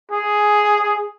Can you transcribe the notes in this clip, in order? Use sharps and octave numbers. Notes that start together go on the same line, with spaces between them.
G#4